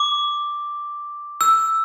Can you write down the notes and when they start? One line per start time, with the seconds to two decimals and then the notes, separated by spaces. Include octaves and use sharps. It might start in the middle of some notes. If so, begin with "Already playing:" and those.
Already playing: D6
1.41 E6